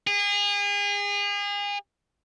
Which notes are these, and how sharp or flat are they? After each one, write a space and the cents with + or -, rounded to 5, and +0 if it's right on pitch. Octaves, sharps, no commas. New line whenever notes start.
G#4 -35